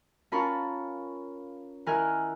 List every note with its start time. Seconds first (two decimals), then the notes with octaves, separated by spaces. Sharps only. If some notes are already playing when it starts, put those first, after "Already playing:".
0.32 C#4 F4 A#4 A5 B5 C#6
1.86 D#3 E4 A#4 G#5 F6 F#6